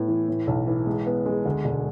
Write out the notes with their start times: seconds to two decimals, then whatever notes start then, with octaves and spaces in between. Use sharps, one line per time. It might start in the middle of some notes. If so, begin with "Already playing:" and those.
Already playing: A2 B3
0.08 E3
0.28 A2
0.47 B1
0.67 E3
0.86 G#3
1.06 B3
1.26 G#3
1.46 D2
1.65 E1